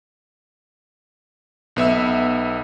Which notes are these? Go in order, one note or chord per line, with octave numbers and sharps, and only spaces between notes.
B1 B3 E5 E6